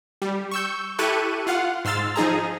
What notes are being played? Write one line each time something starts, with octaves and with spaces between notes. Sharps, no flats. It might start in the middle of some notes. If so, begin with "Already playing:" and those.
G3
C#6 E6 G6
E4 G4 A4 C#6 F#6 D#7
F4 F5 F#5
G#2 C6 E6 F6 A6
F3 D#4 G#4 A#5